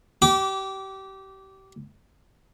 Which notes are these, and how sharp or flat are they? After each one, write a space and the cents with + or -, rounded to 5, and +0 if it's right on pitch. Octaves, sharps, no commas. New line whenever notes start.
G4 -30 D6 -15